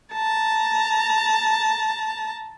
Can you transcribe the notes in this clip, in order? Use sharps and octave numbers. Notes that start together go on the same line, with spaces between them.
A5 A#5